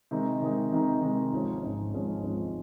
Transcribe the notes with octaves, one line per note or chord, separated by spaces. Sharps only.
C3 D#3 G#3 D#4
C3 D#3 G#3 D#4
C3 D#3 G#3 D#4
C3 D#3 G#3 D#4
G#1 G#2 F3 G#3 C#4
G#1 G#2 F3 G#3 C#4
G#1 G#2 F3 G#3 C#4
G#1 G#2 F3 G#3 C#4